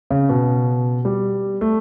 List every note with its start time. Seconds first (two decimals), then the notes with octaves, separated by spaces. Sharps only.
0.10 C#3
0.29 B2
1.05 G3
1.61 A3